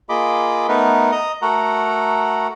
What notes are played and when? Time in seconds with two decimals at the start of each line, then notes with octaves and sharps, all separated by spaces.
0.09 A#3 F4 G#4 D#5 B5 D6
0.68 A3 B3 D#4 A#4 B4
1.12 D#5 A#5 D#6
1.42 A3 F#4 A4 A#4 F#5 A#5